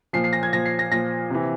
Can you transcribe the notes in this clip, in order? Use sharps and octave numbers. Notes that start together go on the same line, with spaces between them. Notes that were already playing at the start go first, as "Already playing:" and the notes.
A#2 F3 C7
C7
A#6
G#6
A#2 F3 A#6
C7
A#6
A#2 F3 A#6
C3 E3